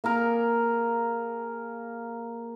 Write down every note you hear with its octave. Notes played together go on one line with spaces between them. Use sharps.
A#3 G#4 A#4